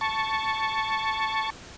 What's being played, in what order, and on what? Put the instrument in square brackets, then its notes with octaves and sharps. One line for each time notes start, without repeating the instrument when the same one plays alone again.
[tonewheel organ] A5 C#6